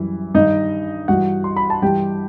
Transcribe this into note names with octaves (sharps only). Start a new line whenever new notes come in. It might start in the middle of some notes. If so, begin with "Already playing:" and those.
Already playing: F#2 E3 G3
G2 D#3 G3 D#4 D#5
G2 E3 G3 F#4 F#5
C6
B5
A5
G2 E3 G3 G4 G5